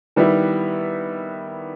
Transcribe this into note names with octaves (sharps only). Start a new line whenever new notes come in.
D#3 G3 B3 E4